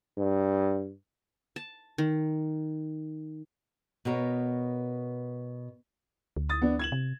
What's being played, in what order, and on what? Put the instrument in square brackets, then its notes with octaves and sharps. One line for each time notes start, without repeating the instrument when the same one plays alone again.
[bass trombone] G2
[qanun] A5
D#3
[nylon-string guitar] B2 B3 A#4 C#5
[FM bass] D2
[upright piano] D#6 A6
B3 D4
G#6 E7 F#7
[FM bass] C3